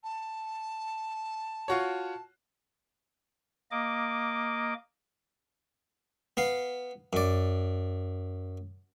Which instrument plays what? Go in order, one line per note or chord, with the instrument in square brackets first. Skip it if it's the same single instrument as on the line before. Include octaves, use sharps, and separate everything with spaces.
[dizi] A5
[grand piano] F4 F#4 C#5
[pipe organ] A#3 D#5 D6
[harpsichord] B3 F5
F#2 D5